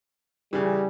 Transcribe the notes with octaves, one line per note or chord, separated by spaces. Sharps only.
C#3 E3 G3